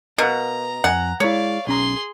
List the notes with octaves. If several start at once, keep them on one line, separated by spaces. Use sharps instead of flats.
B2 A#4 F5 F#5 A#5
F2 F#5 G#5
G#3 E4 C#5 D5 F5
B1 C#4 G#4 A#5 C6